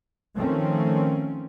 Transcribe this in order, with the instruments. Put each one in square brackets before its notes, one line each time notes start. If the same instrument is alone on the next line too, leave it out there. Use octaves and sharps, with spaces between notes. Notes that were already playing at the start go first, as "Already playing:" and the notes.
[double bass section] D#3 F3 A3 C4 C#4